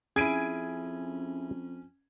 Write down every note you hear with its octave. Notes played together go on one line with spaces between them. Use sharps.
F2 C#4 E4 G#4 G#6 D7 D#7